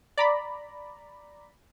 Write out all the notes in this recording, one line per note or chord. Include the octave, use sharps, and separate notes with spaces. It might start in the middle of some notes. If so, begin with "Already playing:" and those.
D5 A#5 B5